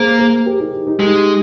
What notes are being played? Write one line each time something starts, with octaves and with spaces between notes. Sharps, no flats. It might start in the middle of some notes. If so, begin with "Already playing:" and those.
Already playing: A#3 G#4 C5
G#4 C5
G4 A#4
D#4 G4
D#4 G4
G#3 D#4 G4